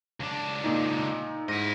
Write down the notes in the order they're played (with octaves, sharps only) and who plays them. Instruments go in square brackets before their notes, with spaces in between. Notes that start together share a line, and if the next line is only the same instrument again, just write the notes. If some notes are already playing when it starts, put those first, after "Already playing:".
[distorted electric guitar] C#2 D4
[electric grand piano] A#2 D#4
[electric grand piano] G#2 [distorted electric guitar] E4 D#5